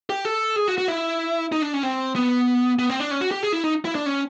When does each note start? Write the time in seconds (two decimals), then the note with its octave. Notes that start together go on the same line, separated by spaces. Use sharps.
0.10 G4
0.25 A4
0.56 G#4
0.68 F#4
0.78 F#4
0.88 E4
1.52 D#4
1.62 D4
1.74 C#4
1.83 C4
2.15 B3
2.79 B3
2.90 C4
3.00 D4
3.11 C#4
3.21 F#4
3.31 G4
3.43 G#4
3.52 E4
3.64 D#4
3.85 E4
3.95 D4
4.06 C#4